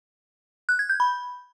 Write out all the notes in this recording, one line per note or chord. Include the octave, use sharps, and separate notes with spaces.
F#6
G#6
G6
B5